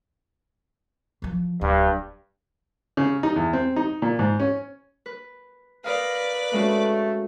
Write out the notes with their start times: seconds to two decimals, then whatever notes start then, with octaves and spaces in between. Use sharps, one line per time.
1.22 E3 F3
1.61 D1 G2
2.97 C#3
3.23 D#4
3.36 E2
3.53 C4
3.76 D#4
4.02 A#2
4.19 G#2
4.40 C#4
5.06 B4
5.84 A#4 B4 D5 D#5 F5
6.53 G#3 A3 C#4 F#4